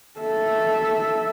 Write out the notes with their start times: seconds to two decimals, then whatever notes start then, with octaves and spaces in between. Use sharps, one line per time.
0.20 A4 E5